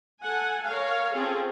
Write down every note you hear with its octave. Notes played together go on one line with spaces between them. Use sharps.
A4 F#5 G#5
A#4 C#5 F5
C4 C#4 F4 G#4 A4